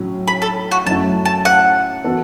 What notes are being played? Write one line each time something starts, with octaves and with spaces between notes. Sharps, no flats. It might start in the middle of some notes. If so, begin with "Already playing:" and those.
Already playing: A2 F#3 C#4
B5
A4
F#4
F#2 F#3 A3 E4 A5
A5
F#5
E3 B3 F#4 A4